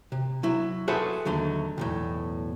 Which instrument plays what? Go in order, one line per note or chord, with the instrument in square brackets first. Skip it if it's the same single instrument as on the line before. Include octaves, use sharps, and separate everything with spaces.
[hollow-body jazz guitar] C3
F#3 E4
F#4 G#4 A4 B4 C5 E5
D#2 D3 F#3 A3
B1 E2 A2